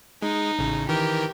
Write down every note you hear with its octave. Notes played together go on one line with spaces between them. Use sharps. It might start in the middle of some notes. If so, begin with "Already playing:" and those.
G#3 D#4
A1 C#3
D#3 E3 G4 A#4